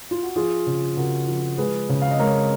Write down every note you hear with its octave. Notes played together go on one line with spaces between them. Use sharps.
F4
F#4
F3 F4 G#4
C#3
C#3 F#4 A#4
F3
G#3 G#4 B4
C#3
F5
D#5
G#3 A#4 C#5